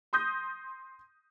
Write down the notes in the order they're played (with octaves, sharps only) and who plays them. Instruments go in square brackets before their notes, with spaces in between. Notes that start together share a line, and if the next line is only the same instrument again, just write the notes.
[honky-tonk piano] C6 D#6 G6 A#6